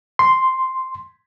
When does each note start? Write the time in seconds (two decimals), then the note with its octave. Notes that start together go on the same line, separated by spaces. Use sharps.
0.19 C6